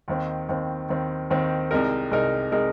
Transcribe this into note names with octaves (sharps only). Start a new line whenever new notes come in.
D#2 D#3 C4
D#2 D#3 C4
D#2 D#3 C4
D#2 D#3 C4
C2 C3 G#3 D#4 A#4
C2 C3 G#3 D#4 A#4
C3 G#3 D#4 A#4